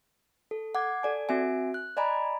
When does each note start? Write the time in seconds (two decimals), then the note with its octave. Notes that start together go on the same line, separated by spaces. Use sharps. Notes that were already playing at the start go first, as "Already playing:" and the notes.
0.51 A4
0.75 F#5 D6 G#6
1.03 A4 D5 G#5
1.29 C4 F#4 E5 G#5
1.74 F#6
1.97 D5 D#5 G#5 A#5 B5